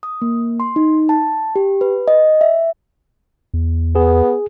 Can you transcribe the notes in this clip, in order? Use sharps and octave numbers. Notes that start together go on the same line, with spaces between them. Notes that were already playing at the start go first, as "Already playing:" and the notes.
D#6
A#3
C6
D#4
A5
G4
B4
D#5
E5
E2
B3 G#4